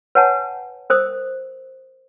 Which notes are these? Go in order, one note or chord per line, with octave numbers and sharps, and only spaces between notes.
B4 C#5 F#5 G#5 A5
A#4 C5 D#6